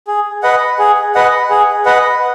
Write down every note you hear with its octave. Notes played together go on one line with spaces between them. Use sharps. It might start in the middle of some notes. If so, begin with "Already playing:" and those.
G#4
B4 D#5 F#5
G#4
B4 D#5 F#5
G#4
B4 D#5 F#5